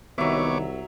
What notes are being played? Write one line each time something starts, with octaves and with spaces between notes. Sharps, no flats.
C2 D#3 F#3 B3 C#5 E5 D6